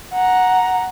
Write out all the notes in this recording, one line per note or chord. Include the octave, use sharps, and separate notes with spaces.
F#5 A#5